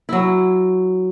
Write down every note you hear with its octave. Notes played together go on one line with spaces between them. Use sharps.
F#3 E4